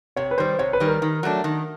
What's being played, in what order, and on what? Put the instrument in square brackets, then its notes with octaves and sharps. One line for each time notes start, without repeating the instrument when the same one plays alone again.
[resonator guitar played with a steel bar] C3 [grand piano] C#5
[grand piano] B4
[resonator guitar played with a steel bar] D#3 G3 [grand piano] C5
[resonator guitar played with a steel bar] C3 [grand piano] C#5
[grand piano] B4
[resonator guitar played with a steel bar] D#3 G3
[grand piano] A#4
[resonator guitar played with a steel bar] D#3
F#3 A3 D4
D#3